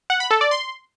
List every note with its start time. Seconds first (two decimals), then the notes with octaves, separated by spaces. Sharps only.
0.10 F#5
0.20 B5
0.31 A4
0.41 D5
0.51 C6